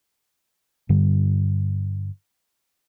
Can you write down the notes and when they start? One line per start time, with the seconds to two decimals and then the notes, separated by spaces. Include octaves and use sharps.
0.89 G2 D3 G3